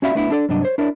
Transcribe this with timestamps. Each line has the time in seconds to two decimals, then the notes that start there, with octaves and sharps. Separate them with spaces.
0.02 C#4 F#4 D5 E5 F5 B5
0.15 A3 B3 D4 E4
0.30 D4 A4 D5
0.49 G2 C3 F#3 D4 D#5
0.62 C5 C#5
0.78 D4 E4 A#4 C#5 D5